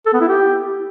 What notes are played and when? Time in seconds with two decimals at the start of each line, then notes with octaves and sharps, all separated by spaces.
0.06 A4
0.14 B3
0.21 E4
0.28 G4